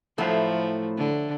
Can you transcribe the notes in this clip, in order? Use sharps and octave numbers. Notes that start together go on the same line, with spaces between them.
A2 F3 F#3 A3 E5 F5
D3